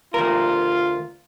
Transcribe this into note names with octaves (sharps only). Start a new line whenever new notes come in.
D2 F4 A#4